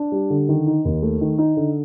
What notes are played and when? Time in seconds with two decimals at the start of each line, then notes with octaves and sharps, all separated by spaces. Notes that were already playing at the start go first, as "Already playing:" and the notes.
Already playing: D4
0.12 G3
0.30 D3
0.49 D#3
0.67 D#4
0.85 D#2
1.02 A3
1.21 D#3
1.38 D#4
1.57 D3